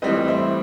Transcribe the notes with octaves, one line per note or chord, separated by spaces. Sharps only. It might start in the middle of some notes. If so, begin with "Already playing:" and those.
A2 E3 G3 C4 B4 D#5
C5 E5